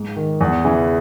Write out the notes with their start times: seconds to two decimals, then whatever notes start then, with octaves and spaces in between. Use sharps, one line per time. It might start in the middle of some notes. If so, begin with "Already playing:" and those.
Already playing: G#2
0.16 D#3
0.41 E2
0.64 C#3 E3